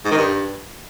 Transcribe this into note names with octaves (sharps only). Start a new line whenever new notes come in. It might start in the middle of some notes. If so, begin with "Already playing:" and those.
G#2
D#3
G2